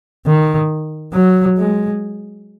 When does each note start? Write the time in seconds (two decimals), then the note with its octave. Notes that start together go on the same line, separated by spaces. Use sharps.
0.26 D#3
1.14 F#3
1.58 G#3